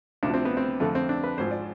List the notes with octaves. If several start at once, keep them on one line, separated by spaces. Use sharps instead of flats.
D2 C3 F3 D4
C4
B3
C4
F2 D3 F3 A3
C4
D4
B4
G#1 G#2 F3 C5
D5